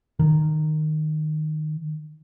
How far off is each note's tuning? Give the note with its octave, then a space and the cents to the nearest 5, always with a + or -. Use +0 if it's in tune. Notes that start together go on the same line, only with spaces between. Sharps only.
D#3 -15